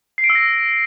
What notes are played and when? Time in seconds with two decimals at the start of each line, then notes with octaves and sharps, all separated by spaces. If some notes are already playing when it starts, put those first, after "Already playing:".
0.18 C7
0.24 D7
0.30 E6
0.35 A#6